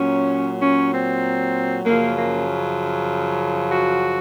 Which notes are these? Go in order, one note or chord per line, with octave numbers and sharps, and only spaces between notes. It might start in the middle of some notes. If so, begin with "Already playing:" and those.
Already playing: A#2 F#3 C#4
C#4
C4
F#2 C#3 F3 A#3
A#3
F#4